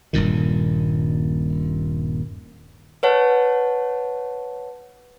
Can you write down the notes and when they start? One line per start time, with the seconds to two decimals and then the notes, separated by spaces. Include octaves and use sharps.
0.13 D#1 G2 A#2 D#3
3.03 B4 C#5 F#5 A5